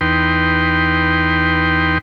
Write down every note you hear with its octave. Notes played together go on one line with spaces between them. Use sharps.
E2 D#4 B4 G5 C6